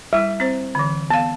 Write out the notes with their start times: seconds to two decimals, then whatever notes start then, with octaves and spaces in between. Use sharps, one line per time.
0.13 G3 E4 E5
0.40 C4 C5
0.75 D3 E3
1.10 B3 F5 A5